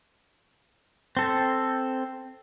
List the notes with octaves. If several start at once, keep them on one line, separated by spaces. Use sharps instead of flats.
C4 A4